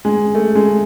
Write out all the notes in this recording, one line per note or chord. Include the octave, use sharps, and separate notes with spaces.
G#3
A3
G#3